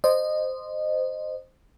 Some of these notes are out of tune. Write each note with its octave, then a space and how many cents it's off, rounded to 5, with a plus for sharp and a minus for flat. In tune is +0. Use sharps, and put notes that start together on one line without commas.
C5 -5 D#5 -20